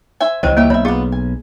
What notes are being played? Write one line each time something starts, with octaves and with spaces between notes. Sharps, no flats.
C5 E5 G#5
G1 C#2 E3 F#3 C4 C5 D#5
F#3 A#3 G4 E5
B1 C#5 E5 B5
B3 F4 G#4
G#5